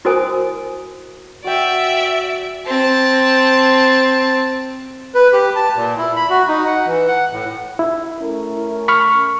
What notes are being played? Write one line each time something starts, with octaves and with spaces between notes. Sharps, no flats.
E4 F#4 A#4 C5 G#5 D#6
F#4 D5 E5 G5
C4 A5
B4
G4
A5
A#2
E4
B5
F#4
D#4
F#5
E3
F#5
A2
E4
A3 C#4 A#4
B5 C#6 F6